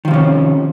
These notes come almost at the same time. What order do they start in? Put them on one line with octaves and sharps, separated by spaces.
D#3 F3 C3 C#4